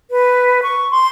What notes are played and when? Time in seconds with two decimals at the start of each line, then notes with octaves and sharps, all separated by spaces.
0.11 B4
0.63 C#6
0.91 C6